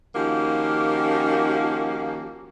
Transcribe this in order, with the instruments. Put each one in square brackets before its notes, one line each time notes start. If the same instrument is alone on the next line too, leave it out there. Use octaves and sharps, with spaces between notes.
[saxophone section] D#3 F3 A#3 C#4 F#4 G4